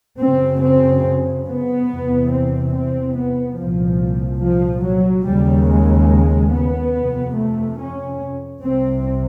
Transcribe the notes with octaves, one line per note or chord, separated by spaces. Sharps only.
F#2 C#3 C4
C4
B3
E2 C3
C4
C4
B3
C2 A#2 F3
F3
F#3
D#2 C#3 G3
G#3
B3
F2 C3
A3
C#4
C2 C3 C4